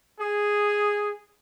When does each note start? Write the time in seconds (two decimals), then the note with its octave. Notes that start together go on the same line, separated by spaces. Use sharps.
0.20 G#4